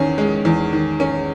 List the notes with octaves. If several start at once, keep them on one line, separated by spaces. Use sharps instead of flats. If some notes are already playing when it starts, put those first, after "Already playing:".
Already playing: E2 D#3 C#4
G#3
E2
D#3
C#4